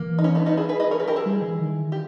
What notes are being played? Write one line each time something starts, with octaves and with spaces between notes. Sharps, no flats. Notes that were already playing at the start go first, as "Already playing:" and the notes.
Already playing: E3 A#3
D#4
C#4
B3 D#4
B3 D#4
E4 G#4
G#4 B4
B4 D#5
A#4 C#5
G#4 B4
G4 A#4
E4 G#4
G3
E3
D#3
G4